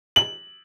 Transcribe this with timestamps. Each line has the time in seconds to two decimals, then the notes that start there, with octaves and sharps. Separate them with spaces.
0.16 F#7